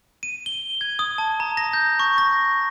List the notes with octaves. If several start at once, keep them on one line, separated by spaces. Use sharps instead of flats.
D#7
G7
G#6
D#6
A5
A#5
A#6
G6
C#6
A#6